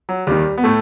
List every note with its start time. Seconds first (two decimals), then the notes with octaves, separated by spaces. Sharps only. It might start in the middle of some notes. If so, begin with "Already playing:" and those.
0.09 F#3
0.27 D#2 D#3 G3
0.58 B3
0.64 A2 A3